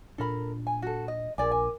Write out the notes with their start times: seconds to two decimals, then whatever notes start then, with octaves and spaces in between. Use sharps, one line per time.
0.18 A#2 D4 A4 A#4 B5
0.67 G#5
0.82 F#4 A4
1.08 D#5
1.38 A#1 G#4 A#4 D5 G#5 D6
1.52 G#5